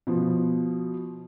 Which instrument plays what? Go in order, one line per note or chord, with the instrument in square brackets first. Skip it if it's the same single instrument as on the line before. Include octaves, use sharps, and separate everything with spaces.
[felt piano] B2 F3